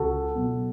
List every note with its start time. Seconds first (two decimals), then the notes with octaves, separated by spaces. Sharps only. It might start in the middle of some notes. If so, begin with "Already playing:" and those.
Already playing: C#2 F#4 A4
0.35 B2 F#3